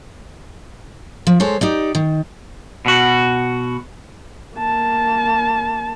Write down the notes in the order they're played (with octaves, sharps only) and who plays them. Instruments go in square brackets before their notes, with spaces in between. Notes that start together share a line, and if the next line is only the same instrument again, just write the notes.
[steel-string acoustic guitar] F3
G#3 A4 C5 C#5
D#4 G4 D5
D#3
[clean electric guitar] B2 F#4
[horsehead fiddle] A#3 A5